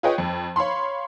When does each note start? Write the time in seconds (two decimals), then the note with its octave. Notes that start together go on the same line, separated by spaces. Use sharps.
0.03 F4 G#4 B4 C#5 D#5 G5
0.18 F2
0.56 C#5 F5 B5 C6